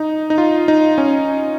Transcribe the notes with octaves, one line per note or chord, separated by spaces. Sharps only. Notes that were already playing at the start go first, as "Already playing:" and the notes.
Already playing: D#4
D#4
F4
D#4
C#4